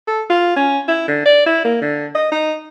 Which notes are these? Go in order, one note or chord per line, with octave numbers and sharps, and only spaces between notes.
A4
F4
C#4
E4
D3
D5
E4
A#3
D3
D#5
D#4